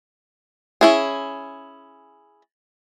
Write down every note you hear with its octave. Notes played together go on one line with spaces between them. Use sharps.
C#4 E4 G#4